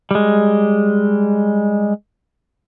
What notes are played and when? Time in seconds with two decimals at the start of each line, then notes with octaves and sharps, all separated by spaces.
0.11 G3 G#3